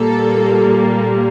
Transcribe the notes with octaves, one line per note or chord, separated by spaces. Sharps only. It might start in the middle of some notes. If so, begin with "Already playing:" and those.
Already playing: A#2 G3 A#3 A4